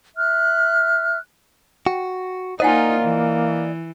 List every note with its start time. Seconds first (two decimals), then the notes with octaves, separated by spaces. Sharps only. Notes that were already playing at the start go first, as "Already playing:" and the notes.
0.16 E5 F6 F#6
1.87 F#4 G5
2.60 A#3 D#4 F4 C5 D5 D#5 F#5 G#5
3.02 E3